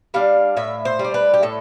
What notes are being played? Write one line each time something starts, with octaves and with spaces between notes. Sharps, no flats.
G3 D4 F5
A2 E5
C5
G3
D4
B4
G4
A2 A4